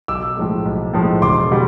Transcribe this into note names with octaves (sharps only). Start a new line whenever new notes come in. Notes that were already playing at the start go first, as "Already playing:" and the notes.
B1 D6 E6
A2 F3 G#3
B1
A2 F3 G#3
E1 C6 D6
B2 G3